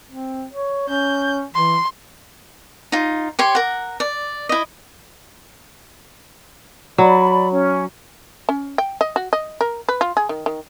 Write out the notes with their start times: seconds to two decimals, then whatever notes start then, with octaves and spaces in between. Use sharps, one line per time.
0.11 C4
0.52 C#5
0.89 C#4 G6
1.55 E3 C6
2.92 D#4 F4
3.39 G4 C#5 C6
3.55 A#4 F#5
4.00 D5
4.49 E4 D#5
6.98 F#3 D5 B5
7.51 C#4
8.49 C#4
8.78 G5
9.01 D#5
9.16 F#4
9.33 D#5
9.61 A#4
9.89 B4
10.01 F4
10.17 G#4
10.29 D#3
10.46 D#3